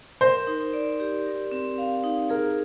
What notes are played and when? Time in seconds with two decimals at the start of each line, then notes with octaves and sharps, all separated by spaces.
0.21 A#4 C5
0.47 D#4
0.73 D5
1.00 G4
1.26 A#4
1.52 C4
1.78 F5
2.04 D#4
2.30 G#4 A#4